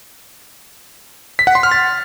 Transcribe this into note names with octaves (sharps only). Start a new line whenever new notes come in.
B6
F#5
C6
F6
A6